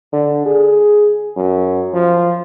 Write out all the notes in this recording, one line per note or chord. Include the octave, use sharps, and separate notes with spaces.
D3
G#4
F#2
F3